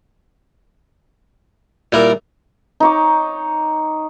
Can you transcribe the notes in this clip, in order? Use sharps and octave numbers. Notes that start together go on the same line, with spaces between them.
A#2 G3 E4 A#4 D6
D#4 C#5 D6